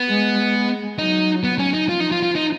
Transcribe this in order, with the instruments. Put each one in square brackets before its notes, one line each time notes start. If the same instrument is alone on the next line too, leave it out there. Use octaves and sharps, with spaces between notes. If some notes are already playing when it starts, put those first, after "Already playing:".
Already playing: [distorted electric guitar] B3
[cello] G#3
G#3
[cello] F#3 [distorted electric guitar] D#4
[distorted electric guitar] B3
C#4
D#4
[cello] F3 [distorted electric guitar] F4
[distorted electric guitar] D#4
F4
F4
D#4